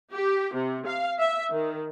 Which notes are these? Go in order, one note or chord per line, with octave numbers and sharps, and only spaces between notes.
G4
C3
F5
E5
D#3